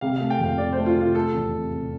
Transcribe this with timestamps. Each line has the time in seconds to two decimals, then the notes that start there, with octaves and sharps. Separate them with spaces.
0.01 C3 F5
0.16 A3 F5
0.30 G5
0.40 F2
0.45 F5
0.58 C3 D5
0.73 A3 C5
0.86 F4
0.96 C3 F4
1.15 A3 A4
1.34 E2
1.53 C3
1.72 C3